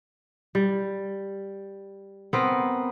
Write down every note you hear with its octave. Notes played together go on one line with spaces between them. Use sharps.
G3
B3 C4 A#4